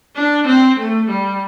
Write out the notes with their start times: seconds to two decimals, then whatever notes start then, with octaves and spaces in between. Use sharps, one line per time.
0.15 D4
0.47 C4
0.79 A3
1.10 G3